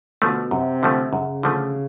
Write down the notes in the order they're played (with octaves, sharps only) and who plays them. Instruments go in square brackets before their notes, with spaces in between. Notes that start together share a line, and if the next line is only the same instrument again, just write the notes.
[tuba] B2 [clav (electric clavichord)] D3 F3 A3
[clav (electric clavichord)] F#2 [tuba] C3
[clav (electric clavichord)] D3 F3 A3
[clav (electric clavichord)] F#2 [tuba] C#3
[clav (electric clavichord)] D3 F3 A3